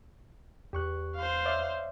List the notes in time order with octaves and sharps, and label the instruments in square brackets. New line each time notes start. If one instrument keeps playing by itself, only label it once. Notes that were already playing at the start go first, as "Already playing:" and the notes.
[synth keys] E2 [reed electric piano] G4 C#6 F#6
[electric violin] C5 F5
[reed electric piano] C#5 D5 E5